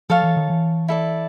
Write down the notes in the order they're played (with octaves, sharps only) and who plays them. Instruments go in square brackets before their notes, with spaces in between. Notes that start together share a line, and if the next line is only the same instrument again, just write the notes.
[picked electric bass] F3 [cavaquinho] A4 C#5 F5 A5
[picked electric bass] E3
D#3
E3
[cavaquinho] E4 A4 D5